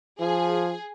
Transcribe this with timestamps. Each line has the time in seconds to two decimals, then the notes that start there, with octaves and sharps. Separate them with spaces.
0.20 F3 G#4